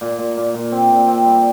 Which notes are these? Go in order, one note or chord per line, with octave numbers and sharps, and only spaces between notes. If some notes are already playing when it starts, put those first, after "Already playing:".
A#2
A#2
A#2
A#2
C4
A#2
C4
G3